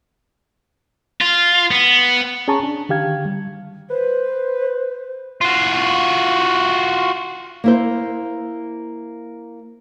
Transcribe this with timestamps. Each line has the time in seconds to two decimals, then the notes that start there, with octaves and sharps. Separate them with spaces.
1.21 F4
1.71 B3
2.48 C#4 G#4 C#5 A5 A#5 C#6
2.63 D4
2.89 D3 D#3 G4 F5 G#6
3.25 G3
3.90 B4 C5
5.41 F4 F#4
7.64 A#3 E4 C5